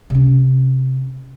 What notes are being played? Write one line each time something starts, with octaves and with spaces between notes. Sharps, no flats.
C3 C#4